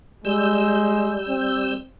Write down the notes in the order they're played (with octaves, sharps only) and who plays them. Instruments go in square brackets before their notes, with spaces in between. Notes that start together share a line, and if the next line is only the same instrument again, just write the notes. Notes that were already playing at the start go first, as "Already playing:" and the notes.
[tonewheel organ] G3 E6 G6 [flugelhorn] G#3
[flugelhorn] C4